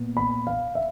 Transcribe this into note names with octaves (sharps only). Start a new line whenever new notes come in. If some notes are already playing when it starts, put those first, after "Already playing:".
Already playing: A#2 B3
B5
F5
E5